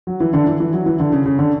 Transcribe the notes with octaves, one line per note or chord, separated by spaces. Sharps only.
F#3
E3
D3
E3
E3
F#3
E3
D3
C#3
C#3
D3